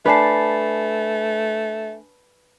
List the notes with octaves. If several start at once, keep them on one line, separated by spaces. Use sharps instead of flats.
A3 D4 B4 D5 G#5 A5 C7